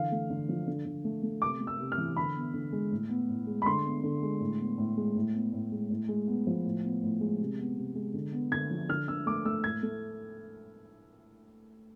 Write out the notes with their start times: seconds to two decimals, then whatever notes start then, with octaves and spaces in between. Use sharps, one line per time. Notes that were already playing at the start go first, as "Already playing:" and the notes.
Already playing: D3 E3 F5
0.12 A3
0.30 D3
0.49 F3
0.67 D3
0.85 D3
1.04 A3
1.23 A3
1.42 C3 D6
1.60 A3
1.67 E6
1.80 C3
1.92 F6
1.98 E3
2.16 D3 B5
2.36 B3
2.54 D3
2.72 G#3
2.91 A2
3.09 B3
3.29 A2
3.47 G#3
3.62 B5
3.66 D3 C6
3.85 B3
4.03 D3
4.22 G#3
4.40 A2
4.60 B3
4.78 A2
4.97 G#3
5.15 A2
5.34 B3
5.53 A2
5.71 G#3
5.90 A2
6.08 G#3
6.27 B3
6.47 F3
6.65 A2
6.84 B3
7.03 A2
7.21 G#3
7.40 C3
7.59 B3
7.77 C3
7.95 G#3
8.14 D3
8.33 B3
8.52 D3 G#6
8.70 F3
8.89 D3 F6
9.08 D3 E6
9.26 A3 D6
9.45 A3 E6
9.63 A2 G#6
9.83 A3